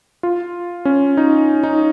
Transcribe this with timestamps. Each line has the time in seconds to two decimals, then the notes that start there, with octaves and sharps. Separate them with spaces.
0.23 F4
0.85 C#4
1.17 D#4
1.63 D#4